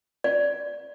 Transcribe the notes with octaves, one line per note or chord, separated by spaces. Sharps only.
D5